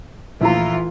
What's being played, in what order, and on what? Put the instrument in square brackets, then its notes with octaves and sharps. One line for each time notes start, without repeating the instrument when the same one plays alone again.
[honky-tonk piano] A#1 E4 A#5 [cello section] E3 A3 F4